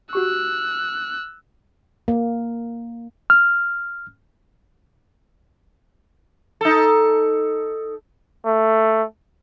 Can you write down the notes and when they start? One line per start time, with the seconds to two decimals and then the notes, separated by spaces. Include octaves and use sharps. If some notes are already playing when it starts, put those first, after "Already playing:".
0.13 F#4 G4 C#6 E6 F#6
2.08 A#3
3.30 F6
6.61 D#4 A4
8.45 A3